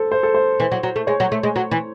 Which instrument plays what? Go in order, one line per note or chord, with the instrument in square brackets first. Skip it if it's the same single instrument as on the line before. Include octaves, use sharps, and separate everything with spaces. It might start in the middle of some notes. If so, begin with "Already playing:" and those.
Already playing: [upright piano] A4 C5
C5
A4
C5
[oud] E3
F#3
F#3
A3
[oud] G#3 [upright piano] C#5
[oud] F#3
A3
G#3
F#3
E3